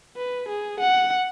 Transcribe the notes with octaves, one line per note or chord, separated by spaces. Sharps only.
B4
G#4
F#5